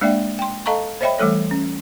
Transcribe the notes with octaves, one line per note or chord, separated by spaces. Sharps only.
G#3 A#3 D4 D5 E5 G5
G5 C6
A4 D#5 F5 A5 A#5 C#6
C5 C#5 D#5 E5 G5 B5
E3 G3 A3 A4 C#5
C#4